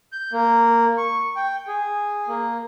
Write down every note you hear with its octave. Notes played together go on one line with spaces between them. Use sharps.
G6
A#3
C#6
G5
G#4
A#3